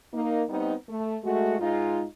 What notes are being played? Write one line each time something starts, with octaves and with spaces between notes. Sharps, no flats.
A#3 D#4
G3 B3 C4 D#4
A3
G#3 A3 F#4
G#2 G#3 D#4 F4